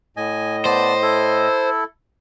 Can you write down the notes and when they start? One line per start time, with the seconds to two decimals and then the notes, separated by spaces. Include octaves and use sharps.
0.17 A2 D#5 G#5
0.66 B3 C5 D5 A5
1.02 E4 A4